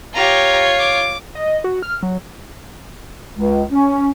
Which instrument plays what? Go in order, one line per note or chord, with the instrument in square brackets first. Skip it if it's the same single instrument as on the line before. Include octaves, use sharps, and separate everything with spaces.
[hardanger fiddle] F4 C#5 [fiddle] G4 A#5
[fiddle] D6
[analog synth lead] D#5
F#4
F6
F#3
[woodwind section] C#2
C#4